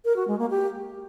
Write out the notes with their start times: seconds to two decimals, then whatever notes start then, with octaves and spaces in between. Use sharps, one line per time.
0.05 A#4
0.16 F#4
0.28 G#3
0.39 A#3
0.50 G4